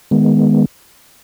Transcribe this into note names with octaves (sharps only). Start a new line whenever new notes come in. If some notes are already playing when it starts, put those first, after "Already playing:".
D#3 G#3 B3